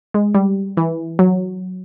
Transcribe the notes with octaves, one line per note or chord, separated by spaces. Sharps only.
G#3
G3
E3
F#3